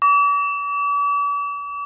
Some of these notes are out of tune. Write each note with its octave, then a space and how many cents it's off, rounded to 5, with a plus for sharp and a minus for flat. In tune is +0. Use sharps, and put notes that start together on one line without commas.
D6 -45